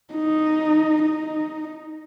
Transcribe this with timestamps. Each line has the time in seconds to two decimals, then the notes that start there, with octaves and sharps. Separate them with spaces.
0.14 D#4
1.02 D#4